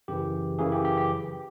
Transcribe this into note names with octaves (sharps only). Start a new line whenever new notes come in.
F#2 C#3 E3 G4
F#2 C#3 E3 G#4
G4
G4
G4